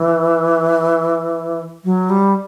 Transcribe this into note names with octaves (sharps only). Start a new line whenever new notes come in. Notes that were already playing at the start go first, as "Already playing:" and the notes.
Already playing: E3
F#3
G3